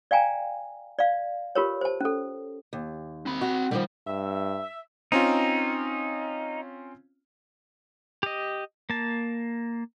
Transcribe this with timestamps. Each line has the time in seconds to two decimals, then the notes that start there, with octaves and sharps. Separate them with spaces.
0.11 D5 F5 G5 G#5 A#5
0.99 D5 F5
1.55 F4 G4 A#4 B4 C#5
1.81 C5 A5
2.01 C#4 A4
2.73 D#2
3.26 C4 B5
3.41 F#4
3.71 D3 D#3 F3 G3
4.07 G2 E5
5.12 C4 C#4 D#4 F4
8.23 G4 D#5
8.90 A#3 A5